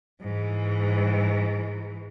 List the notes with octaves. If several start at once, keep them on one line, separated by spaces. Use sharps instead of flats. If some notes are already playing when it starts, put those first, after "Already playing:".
G#2 E3